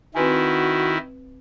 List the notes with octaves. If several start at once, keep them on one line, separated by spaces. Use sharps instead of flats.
D#3 C4 E4 F#4 B4 G#5